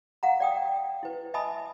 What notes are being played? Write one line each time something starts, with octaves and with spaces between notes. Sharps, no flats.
F5 F#5 A#5
D5 G5 D#6
E4 B4
D#5 E5 G#5 A5 B5 D#6